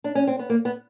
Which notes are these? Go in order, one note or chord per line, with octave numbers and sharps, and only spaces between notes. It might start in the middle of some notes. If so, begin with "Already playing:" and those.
D4
C#4
C4
B3
A#3
B3